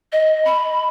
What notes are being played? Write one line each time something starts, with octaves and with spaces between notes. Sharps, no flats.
D#5
B5